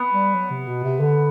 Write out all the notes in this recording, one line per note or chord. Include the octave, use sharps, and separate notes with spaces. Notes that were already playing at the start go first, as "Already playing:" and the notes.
Already playing: B3
G3
F#3
C3
B2
C3
D3